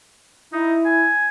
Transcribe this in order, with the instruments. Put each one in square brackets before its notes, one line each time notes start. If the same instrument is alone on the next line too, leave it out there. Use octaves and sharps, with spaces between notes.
[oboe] D#4 [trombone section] E4
[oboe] G#5